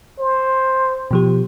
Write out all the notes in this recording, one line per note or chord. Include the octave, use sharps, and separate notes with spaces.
C5
B2 F3 G4